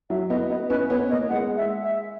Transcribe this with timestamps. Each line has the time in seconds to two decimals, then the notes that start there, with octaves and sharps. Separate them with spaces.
0.10 F#3 E5
0.29 B3 D#5
0.50 B3 D#5
0.69 C#4 B4
0.89 B3 C#5
1.10 A#3 D#5
1.29 G#3 F#5
1.56 E5
1.83 E5